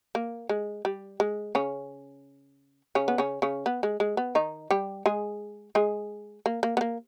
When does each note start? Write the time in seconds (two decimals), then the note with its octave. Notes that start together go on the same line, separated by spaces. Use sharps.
0.15 A#3
0.49 G#3
0.85 G3
1.20 G#3
1.55 C#3 C#4
2.95 C#3 C#4
3.08 B3
3.18 C#3 C#4
3.42 C#3 C#4
3.66 B3
3.83 G#3
4.00 G#3
4.17 B3
4.35 D#3 D#4
4.71 G3 G4
5.06 G#3 G#4
5.75 G#3 G#4
6.46 A#3
6.63 A#3
6.77 B3
6.81 A#3